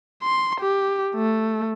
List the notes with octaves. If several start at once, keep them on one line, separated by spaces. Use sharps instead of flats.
C6
G4
A3